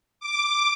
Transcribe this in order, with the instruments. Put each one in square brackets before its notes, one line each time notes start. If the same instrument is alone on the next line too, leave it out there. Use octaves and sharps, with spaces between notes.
[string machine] D6